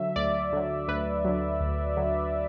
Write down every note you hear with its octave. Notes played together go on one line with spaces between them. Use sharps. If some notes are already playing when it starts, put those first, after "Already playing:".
Already playing: D3 F#3 E5
D2 D5
D3 F#3
D2 B4
D3 F#3
D2
D3 F#3